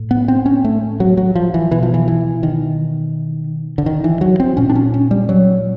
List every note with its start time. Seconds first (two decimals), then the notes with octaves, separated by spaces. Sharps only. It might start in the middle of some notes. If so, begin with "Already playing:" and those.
Already playing: A2
0.11 B3
0.28 C4
0.46 C#4
0.64 A3
1.00 F#3
1.17 F#3
1.35 F3
1.54 E3
1.71 B2 E3
1.83 F3
1.94 E3
2.08 E3
2.43 D#3
3.78 D3
3.86 D#3
4.04 E3
4.21 F#3
4.40 C4
4.57 A#2 C#4
4.69 D4
4.75 C#4
4.94 C#4
5.11 G3
5.29 F#3